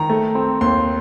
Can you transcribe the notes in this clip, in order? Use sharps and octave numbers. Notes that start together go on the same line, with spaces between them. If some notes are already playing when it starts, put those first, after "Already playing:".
Already playing: D#3 A#5
A3
C4
D#2 C6